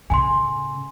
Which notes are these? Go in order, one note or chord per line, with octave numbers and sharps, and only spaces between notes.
A2 C#3 G#5 C6